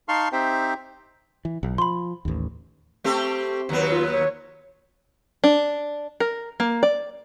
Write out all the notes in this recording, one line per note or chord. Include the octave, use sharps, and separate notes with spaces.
D#4 F5 A5 C6 C#6 F6
C4 D#4 G4 C5 E5 G5
E3
B1
F3 B5 C6
A1 D#2
A3 C4 G4
D#2 F#3 B3
F4
C#5
D4
A#4
A#3
D5